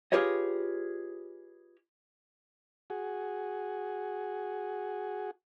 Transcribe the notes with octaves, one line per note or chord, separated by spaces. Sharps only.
F4 G4 G#4 B4 C#5 D#5
F#4 G#4